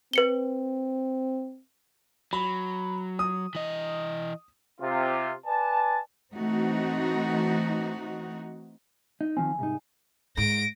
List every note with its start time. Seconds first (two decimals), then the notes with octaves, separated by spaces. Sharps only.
0.13 C4 B4 C#7 G7
2.33 F#3 B5
3.19 D#6
3.55 E3 D#5
4.81 C3 F4
5.47 B4 D5 G#5 A5
6.34 E3 A3 C4 D#4 F#4
9.21 D#4
9.37 D#3 F3 C4 G#5
9.59 C2 G#2 D#4
10.37 G#2 A#6 D7